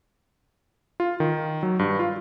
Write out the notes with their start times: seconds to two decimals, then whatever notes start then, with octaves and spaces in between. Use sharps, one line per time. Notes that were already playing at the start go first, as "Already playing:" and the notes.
1.00 F4
1.20 D#3
1.63 F#3
1.79 G2
1.99 F4